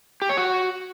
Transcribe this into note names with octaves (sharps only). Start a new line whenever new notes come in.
G4
C#5
F#4